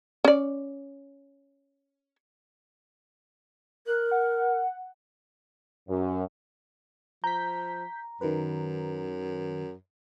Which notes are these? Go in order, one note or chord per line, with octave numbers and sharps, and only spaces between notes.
C#4 D5
A#4 F#6
F#5
F#2
F3 A#5 G6 B6
F#2 D#3 B4